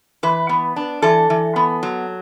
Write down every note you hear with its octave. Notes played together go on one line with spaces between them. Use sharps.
E3 B4
B3
D4
E3 A4
E3
B3
F#3